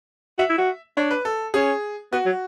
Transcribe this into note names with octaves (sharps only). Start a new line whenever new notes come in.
F#4 E5
E4
F#4
D4 C#5
B4
A4
C#4 G#4
B3 F#4
F#3